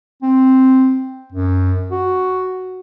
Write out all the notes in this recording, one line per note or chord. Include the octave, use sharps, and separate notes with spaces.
C4
F#2
F#4